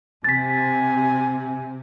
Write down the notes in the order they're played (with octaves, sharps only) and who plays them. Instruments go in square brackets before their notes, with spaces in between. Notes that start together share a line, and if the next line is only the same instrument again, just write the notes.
[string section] C3 [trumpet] G#5 [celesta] A6 B6